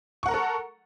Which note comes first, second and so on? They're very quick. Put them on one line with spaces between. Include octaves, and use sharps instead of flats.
C#6 F#5 A#4 A#5 A4